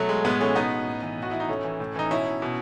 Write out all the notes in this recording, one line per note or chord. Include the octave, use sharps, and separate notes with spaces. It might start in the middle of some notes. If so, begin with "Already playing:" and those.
Already playing: B2 F#3 A3
G#3
A2 G#3 B3
E3 A3 C#4
B2 B3 D#4
A2
E3
A2 F#4
E3 E4
D#4
A2 A3 C#4
E3
A2
E3 D#4
B2 C#4 E4
B2